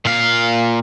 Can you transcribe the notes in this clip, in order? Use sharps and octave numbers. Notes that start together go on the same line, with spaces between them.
A#2 F5